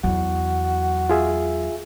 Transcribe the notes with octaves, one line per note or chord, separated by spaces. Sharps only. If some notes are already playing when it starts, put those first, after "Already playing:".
E2 F#3 F#4
F4 G#4 E5